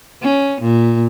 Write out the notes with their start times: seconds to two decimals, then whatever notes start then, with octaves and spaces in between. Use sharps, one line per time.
0.22 C#4
0.61 A#2